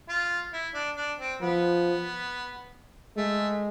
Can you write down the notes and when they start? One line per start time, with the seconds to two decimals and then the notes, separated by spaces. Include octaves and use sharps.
0.09 F4
0.53 E4
0.74 D4
0.97 D4
1.19 C4
1.41 F3 B3
3.17 G#3 A3